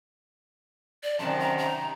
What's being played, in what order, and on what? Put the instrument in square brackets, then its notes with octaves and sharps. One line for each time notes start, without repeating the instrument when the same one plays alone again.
[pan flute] D5
[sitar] F#2 C3 D#3 [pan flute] A5
[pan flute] A#5
A#5